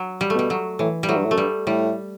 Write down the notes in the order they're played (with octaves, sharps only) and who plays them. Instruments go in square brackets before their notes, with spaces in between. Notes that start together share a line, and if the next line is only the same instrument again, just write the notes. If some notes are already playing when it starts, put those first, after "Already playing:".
Already playing: [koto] F#3
G3
A3
[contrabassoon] B2 [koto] G3
[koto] F#3
[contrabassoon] A2 [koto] E3
[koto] G3
[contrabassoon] A2 [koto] F#3
[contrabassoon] G2
A2
[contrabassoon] F#2 [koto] A3
[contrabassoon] G2 [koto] G3
[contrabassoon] A2 [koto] G3